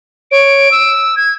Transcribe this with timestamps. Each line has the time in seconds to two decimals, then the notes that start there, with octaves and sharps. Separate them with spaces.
0.31 C#5 D7
0.71 E6
1.17 G#6